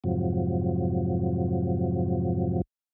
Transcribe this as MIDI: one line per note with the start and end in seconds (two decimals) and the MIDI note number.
0.04 2.62 41
0.04 2.62 44
0.04 2.62 48
0.04 2.62 53
0.04 2.62 54